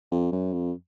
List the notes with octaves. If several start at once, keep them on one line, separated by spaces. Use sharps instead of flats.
F2
F#2
F2